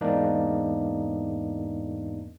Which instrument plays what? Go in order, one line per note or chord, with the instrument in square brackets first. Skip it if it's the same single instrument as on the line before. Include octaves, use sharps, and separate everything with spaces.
[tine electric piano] E2 G#2 A#3 D4 D#4